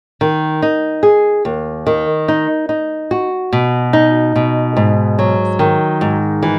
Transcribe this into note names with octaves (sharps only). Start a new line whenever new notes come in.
D#3
D#4
G#4
D#2
D#3
D#4
D#4
F#4
B2
D#4
B2
G#2
F#3
D#3
G#2
E3